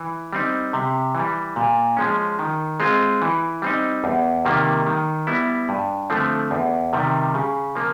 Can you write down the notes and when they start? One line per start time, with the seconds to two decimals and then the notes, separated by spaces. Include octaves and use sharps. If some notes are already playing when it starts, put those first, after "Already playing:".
Already playing: E3
0.33 G3 C4 D#4
0.73 C3
1.15 E3 G3
1.56 A#2
1.97 F3 G#3 C#4
2.39 D#3
2.80 G#3 C4 F4
3.22 E3
3.62 G3 C4 D#4
4.04 E2
4.45 C3 D#3 G3 A#3
4.87 D#3
5.27 G3 B3 E4
5.69 G2
6.10 D3 F3 A3 C4
6.51 E2
6.93 C3 D#3 G3
7.34 C#3
7.75 F3 A#3